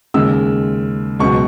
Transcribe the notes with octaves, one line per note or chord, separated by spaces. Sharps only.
D#2 C#3 G#3 E6
C#2 B2 F#3 C#6